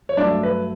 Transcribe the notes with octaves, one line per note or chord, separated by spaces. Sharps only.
C#5
G2 F#3 A3 D4 D5
B4